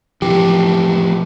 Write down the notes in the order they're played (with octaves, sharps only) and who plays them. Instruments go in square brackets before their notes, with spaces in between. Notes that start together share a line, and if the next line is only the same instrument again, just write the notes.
[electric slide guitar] A2 C3 E3 [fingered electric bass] F3 [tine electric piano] G4